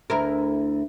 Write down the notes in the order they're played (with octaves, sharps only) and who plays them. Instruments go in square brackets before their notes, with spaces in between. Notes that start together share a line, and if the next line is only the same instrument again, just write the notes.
[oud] D2 E4 A#4